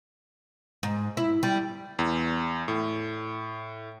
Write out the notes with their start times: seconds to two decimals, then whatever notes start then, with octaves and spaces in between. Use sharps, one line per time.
0.83 G#2
1.17 E4
1.43 G3
1.99 E2
2.68 A2